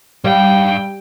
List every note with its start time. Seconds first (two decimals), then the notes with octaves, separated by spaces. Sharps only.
0.24 G2 G3 F5 G5